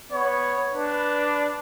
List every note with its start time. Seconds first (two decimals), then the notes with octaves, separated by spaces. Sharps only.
0.12 B3 C#5
0.74 D4 B4